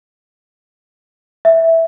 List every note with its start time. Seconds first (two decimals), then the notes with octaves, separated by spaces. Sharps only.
1.45 E5